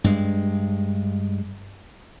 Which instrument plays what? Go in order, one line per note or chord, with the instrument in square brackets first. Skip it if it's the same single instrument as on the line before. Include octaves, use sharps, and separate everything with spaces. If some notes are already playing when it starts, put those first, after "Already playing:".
[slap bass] G2 G#3